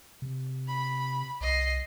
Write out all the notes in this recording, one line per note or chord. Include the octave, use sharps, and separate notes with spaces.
C3
B5
C2 D#5 C7